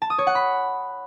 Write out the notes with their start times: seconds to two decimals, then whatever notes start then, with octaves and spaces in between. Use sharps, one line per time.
0.02 A5
0.10 D#6
0.18 C#5
0.27 F#5
0.35 B5